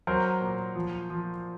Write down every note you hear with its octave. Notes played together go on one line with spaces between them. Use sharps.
F#3 A#4 C5
A#2
F3
F3